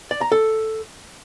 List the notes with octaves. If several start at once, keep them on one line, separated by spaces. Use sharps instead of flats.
D5
A#5
A4